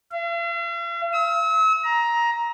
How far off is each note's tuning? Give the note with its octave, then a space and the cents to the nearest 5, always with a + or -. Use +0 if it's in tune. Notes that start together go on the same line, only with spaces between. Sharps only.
F5 -45
E6 -40
A#5 +15